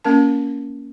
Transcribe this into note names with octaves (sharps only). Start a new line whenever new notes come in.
A#3 C#4 A#4 A5